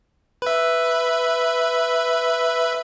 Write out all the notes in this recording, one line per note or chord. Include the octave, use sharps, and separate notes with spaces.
B4 E5